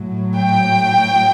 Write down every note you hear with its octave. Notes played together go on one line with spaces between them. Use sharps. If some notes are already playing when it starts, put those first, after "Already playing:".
Already playing: A2 F#3
G5